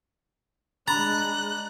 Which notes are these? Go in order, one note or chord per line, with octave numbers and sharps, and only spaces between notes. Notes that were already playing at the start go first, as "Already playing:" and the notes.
G#3 D4 A#5 B5 F#6 A6